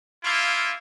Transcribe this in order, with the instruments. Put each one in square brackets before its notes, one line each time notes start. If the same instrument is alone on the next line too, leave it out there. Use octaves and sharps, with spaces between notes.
[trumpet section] A#3 E4 F4